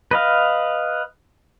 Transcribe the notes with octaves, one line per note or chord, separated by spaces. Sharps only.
B4 D#5 F5